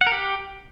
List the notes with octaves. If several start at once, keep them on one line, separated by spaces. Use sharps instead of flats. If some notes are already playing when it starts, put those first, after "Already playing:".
F#5
A#4
G4